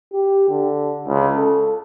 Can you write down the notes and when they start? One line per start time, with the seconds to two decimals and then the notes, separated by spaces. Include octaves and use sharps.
0.13 G4
0.49 D3
1.08 C#2
1.37 A4